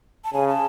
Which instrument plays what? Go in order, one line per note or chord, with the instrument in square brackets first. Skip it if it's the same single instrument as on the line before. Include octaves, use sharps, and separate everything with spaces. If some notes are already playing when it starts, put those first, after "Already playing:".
[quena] A5
[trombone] C#3 [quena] G#5
[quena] A5